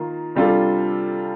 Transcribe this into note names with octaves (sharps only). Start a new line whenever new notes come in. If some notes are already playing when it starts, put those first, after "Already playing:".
Already playing: D#3 A#3 F4
C3 G3 D4 F4 A4